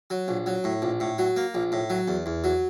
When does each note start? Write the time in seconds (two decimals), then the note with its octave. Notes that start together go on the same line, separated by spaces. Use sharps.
0.10 F#3
0.28 A#1
0.46 F#3
0.64 A2
0.82 A#1
1.00 A2
1.18 F#3
1.36 A#3
1.54 A#1
1.72 A2
1.90 F#3
2.08 E2
2.26 E2
2.44 F#3